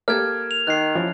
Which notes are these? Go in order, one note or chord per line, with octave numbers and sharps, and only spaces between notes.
A#3 G4 A4 F6 G#6
F7
D#3 F#6 C7
F3 C#4 E4